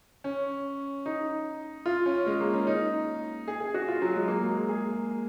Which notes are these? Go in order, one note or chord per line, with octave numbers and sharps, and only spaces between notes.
C#4
D#4
F4
C#4
G#3
A#3
C#4
D#4
G#4
G#4
F#4
F4
F#3
G#3
A#3
G#3
G#4